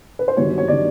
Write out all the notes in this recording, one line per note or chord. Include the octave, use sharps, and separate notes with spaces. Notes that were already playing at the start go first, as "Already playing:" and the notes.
B4
C5
G1 G2 D#3 F#3 C#5
C#5
D#3 F#3 D5